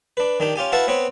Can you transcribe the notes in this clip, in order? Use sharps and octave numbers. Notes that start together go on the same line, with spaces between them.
D4 B4
D#3 D4 G4
C#4 F4 G4 G#5
E4 F#4 B4 F5 F#5 A5
B3 C4 B4 C#5